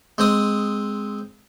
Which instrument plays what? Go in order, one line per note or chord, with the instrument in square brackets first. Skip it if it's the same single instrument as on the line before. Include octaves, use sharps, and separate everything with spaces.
[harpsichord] G#3 C4 D#6